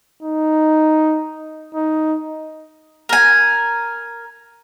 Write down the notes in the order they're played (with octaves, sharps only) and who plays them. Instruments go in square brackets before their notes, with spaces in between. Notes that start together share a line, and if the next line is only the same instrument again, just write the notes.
[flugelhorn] D#4
D#4
[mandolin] A#4 G#5